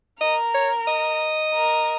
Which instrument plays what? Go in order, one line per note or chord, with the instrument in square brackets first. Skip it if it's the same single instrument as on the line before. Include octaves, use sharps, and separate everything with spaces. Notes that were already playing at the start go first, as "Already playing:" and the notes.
[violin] A#4 [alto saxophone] D#5
[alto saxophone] C#5
D#5
[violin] A#4